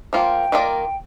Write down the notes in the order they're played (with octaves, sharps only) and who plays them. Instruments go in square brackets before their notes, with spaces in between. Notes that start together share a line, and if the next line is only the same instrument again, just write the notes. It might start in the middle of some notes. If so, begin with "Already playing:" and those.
[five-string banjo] F3 A#3 F4 [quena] G5
[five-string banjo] D#3 A#3 F4 A#4 D5